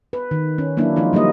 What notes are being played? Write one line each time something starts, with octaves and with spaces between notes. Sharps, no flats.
B4
D#3
C#4
F#3 A#3 D4 E4
F3 G#3 D#4 F4
F#3 G3 A#3 D#4 D#5